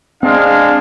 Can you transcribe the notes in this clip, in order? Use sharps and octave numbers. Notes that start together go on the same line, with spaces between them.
G#3 C4 D4 F5